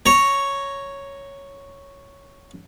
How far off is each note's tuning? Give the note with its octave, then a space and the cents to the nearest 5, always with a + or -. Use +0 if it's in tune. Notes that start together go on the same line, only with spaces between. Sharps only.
C#5 +0 A#5 +0